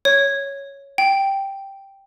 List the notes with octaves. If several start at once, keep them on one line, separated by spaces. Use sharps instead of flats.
C#5
G5